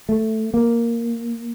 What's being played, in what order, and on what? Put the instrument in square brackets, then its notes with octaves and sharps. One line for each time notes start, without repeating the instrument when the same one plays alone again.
[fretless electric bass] A3
A#3